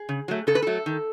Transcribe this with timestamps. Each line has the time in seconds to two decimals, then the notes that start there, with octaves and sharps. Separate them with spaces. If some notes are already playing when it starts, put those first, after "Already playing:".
Already playing: G#4
0.09 C#3
0.28 F#3 A3
0.47 C#3 A4
0.55 B4
0.62 F#3 A3 A4
0.86 D#3